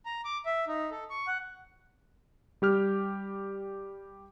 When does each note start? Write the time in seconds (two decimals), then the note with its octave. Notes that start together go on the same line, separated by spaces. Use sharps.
0.06 A#5
0.25 D6
0.46 E5
0.68 D#4
0.91 A4
1.10 C#6
1.27 F#5
2.62 G3 G4 F6